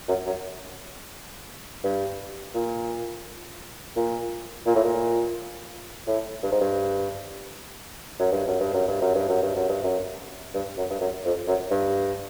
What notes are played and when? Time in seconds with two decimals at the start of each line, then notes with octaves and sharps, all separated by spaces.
0.08 F#2
0.26 F#2
1.84 G2
2.54 A#2
3.96 A#2
4.66 A#2
4.75 A2
4.84 A#2
6.07 A2
6.43 G2
6.52 G#2
6.60 G2
8.19 F#2
8.32 G2
8.47 F#2
8.60 G2
8.73 F#2
8.88 G2
9.01 F#2
9.14 G2
9.28 F#2
9.42 G2
9.55 F#2
9.69 G2
9.83 F#2
10.54 G2
10.77 F#2
10.90 G2
11.00 F#2
11.25 F2
11.47 F#2
11.71 G2